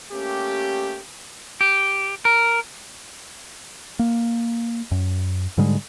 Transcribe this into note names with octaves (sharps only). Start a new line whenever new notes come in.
A3 A#3 C#4 G4
G4
A#4
A#3
F#2
G#2 D3 G3 G#3